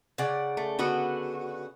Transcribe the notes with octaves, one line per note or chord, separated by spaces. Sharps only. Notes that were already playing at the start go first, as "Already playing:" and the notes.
C#3 D5 F#5
A3
D3 B3 F#4